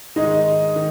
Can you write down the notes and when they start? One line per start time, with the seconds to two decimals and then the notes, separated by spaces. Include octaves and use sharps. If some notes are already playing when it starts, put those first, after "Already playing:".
0.16 G#2 D#3 G#3 D#4 D#5
0.76 D#3